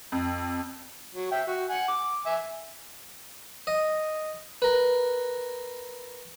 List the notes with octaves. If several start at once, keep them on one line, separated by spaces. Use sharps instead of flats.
F2
F#3
E5 G5
F#4
F#5 G#5
D6
E5 G#5
D#5
A#4 B4